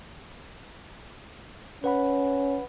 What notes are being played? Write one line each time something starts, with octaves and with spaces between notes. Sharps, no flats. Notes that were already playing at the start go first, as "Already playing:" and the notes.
C#4 B4 F#5 B5